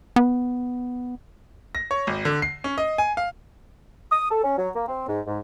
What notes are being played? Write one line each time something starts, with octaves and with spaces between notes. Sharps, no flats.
B3
A#6
C#5
G#1
D3
C7
C#4
D#5
G#5
F5
D#6
A4
C#4
F#3
A#3
C4
G#2
G#2